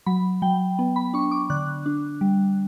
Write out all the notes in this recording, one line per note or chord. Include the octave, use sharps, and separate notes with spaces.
F#3 B5
F#3 G5
B3
B5
D4 C#6
D6
D3 F#6
D4
G3